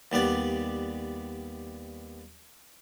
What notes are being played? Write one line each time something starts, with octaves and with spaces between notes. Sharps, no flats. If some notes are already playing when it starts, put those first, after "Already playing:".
D#2 G3 B3 D5